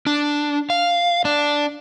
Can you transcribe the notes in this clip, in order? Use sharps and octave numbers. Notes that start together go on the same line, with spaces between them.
D4
F5
D4